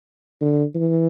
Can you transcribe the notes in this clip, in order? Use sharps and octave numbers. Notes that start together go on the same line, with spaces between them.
D3
E3